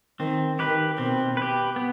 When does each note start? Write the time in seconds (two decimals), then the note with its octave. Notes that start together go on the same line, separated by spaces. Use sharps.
0.20 D#3 C4
0.59 D#3 G4 B4
0.98 B2 C4
1.37 G4 B4
1.76 B3